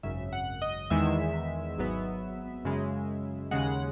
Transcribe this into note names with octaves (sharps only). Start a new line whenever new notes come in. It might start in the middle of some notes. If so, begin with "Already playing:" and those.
G#1 F#2 C#3 E5
F#5
D#5
E2 D#3 G#3 E5
G#1 G#2 F#3 B3
F#2 C#3 G#3
D#2 C#3 G#3 F#5